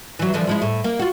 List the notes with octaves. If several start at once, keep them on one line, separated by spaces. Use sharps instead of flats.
E3 F#3
D3 E3 F3
F3 G#3 E4
A2
A#3
F4 F#4